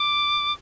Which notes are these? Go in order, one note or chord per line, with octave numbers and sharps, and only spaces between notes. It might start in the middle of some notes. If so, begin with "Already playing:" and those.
Already playing: D6